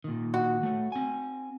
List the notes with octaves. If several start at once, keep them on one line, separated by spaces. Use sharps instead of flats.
A#2 D#3
F#4
A3 C#5
C4 G#5